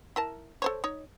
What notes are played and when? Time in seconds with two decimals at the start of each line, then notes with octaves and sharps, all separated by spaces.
0.16 E4 A#4 A5
0.62 A4 C5 C#5
0.84 D#4 C#5